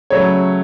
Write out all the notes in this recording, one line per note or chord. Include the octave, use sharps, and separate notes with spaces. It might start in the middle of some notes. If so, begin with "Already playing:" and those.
C#3 F#3 A3 C#5